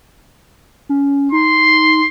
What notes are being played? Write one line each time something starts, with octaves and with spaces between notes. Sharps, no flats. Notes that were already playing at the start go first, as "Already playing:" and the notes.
C#4
D#4 C6